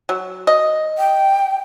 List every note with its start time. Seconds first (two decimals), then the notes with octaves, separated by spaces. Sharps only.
0.09 F#3
0.47 D#5
0.98 G5